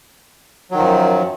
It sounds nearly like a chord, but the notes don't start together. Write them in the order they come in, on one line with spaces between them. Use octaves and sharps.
F#3 D#3 F3 F#2